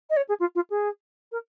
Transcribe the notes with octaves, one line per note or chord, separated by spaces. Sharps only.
D#5
C#5
G#4
F4
F4
G#4
A#4